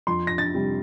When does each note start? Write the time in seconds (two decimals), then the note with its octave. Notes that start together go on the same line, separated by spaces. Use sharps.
0.07 F2 C6
0.27 A#6
0.38 A6
0.54 C3 G3